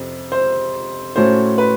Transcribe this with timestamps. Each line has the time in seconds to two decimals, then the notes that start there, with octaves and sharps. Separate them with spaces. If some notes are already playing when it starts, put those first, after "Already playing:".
Already playing: F2 C3 C4
0.32 C5
1.16 A2 F#3 A3 C#4 C5
1.58 B4